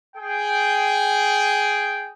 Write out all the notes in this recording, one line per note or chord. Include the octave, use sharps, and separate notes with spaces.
G#4 G5